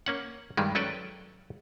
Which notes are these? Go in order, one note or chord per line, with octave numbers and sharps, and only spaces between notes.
A#3 C#4 F#5
G2 D#3 G3 G#3
F#3 C#4 A4 B4 D5 G5